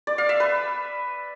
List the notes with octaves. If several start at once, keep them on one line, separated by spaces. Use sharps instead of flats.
D5
F5
E5
B4